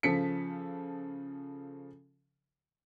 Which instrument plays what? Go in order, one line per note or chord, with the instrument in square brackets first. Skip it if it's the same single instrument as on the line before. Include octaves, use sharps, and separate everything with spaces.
[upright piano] C#3 F3 A4 B6 C#7